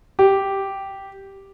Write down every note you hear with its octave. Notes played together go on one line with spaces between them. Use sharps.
G4